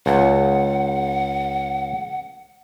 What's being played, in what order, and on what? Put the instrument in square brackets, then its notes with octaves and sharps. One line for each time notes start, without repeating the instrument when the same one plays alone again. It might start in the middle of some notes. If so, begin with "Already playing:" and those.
[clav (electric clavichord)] C#2 [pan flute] F#5